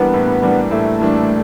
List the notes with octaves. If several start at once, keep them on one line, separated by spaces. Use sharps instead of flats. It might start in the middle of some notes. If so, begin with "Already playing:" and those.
Already playing: E3 G3 A#3 B3 D4
A2
E3 G3 A#3 D4
A2 A3
E3 G3 A#3 D4